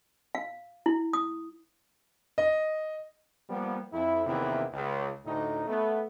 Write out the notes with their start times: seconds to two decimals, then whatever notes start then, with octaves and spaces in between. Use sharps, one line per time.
0.35 F5
0.86 E4
1.13 D#6
2.38 D#5
3.50 F3 G3 A#3 B3
3.92 F2 E4
4.26 E2 C3 D#3 A#3 B3 E4
4.73 C#2
5.25 D2 A2 D#4
5.67 A3 B3